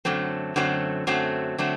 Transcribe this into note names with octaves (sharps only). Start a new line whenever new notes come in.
F#2 D3 F#3 A3 C4
F#2 D3 F#3 A3 C4
F#2 D3 F#3 A3 C4
D3 F#3 A3 C4